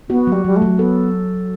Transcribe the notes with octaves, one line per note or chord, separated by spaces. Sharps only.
B3 F#4
F#3 G3
F#3 G3
A3
F#3
B3 A4